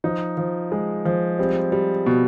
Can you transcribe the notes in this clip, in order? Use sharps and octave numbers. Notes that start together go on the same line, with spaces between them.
F3 D#4
F3
G#3
F3
G3 C4
G3
B2